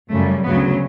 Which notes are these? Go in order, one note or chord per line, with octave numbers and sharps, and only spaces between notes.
F#2 C#3 G3 A3
D2 C#3 F#3 B3